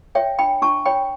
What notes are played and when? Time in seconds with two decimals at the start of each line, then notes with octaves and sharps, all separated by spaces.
0.15 C#5 E5 G5
0.39 D4 G5 B5
0.62 D4 A5 C#6
0.85 C#5 G5 B5